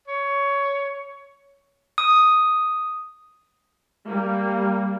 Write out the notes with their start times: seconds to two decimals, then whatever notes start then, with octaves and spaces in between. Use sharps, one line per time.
0.08 C#5
1.98 D#6
4.07 G3 A#3